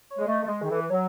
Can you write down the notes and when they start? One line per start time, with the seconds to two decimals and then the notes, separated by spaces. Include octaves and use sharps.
0.11 C#5
0.18 G#3
0.26 A3 D#5
0.43 A3
0.47 G#3 D#5
0.61 D#3 G#4
0.69 E3 A4
0.81 B4
0.90 F#3 C#5